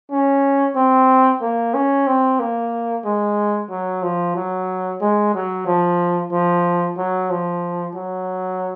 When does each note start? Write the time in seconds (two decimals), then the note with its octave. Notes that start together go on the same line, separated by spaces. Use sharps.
0.11 C#4
0.76 C4
1.41 A#3
1.74 C#4
2.07 C4
2.39 A#3
3.05 G#3
3.70 F#3
4.02 F3
4.36 F#3
5.01 G#3
5.34 F#3
5.66 F3
6.32 F3
6.98 F#3
7.30 F3
7.95 F#3